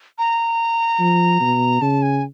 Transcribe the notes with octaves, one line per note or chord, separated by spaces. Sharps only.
A#5
F3
B2
C#3 A5
G#5